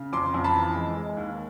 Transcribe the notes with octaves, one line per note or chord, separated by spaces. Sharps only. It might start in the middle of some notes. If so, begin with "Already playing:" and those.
Already playing: C#3
F2 C6 D6
F2
A5 B5
E3
G#3
G#3
D#2